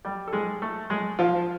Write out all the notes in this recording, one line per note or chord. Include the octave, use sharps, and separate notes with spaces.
G3 G4
A4
G#3 G#4
A3 A4
G#3 G#4
F3 F4